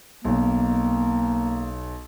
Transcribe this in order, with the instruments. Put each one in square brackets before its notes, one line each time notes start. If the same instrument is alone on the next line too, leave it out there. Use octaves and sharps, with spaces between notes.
[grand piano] B1 [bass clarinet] A#3